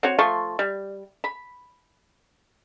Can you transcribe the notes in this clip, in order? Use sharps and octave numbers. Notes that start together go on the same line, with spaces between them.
C4 F#4 C#5
F3 A3 C6 C#6
G3
B5